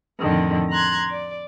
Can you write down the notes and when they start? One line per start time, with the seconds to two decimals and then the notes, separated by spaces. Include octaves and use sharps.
0.19 F2 A2 D3 D#3
0.69 A#5 C6 F#6 G#6
1.08 D5